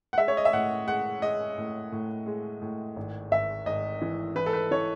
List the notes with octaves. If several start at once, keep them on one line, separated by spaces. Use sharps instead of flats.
F#5
G#3 E5
C#5
D#5
E5
A2 F#5
G#3 F#5
G#3 D#5
A2
A2
G#3
A2
G#1
G#1 E5
G#1 D#5
E3
E3 B4
A4
B4
E3 C#5